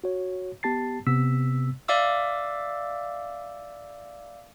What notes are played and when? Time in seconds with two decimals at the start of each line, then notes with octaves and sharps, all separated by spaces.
0.04 F#4 C#5
0.63 B3 G4 A5 A6 C7
1.07 C3 B3 E6 B6
1.88 D5 E5 F5 D6 E6